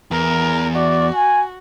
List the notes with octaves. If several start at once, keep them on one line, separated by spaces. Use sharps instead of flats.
E2 A#4
F#4 D5
G#5